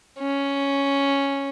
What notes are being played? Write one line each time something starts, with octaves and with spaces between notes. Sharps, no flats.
C#4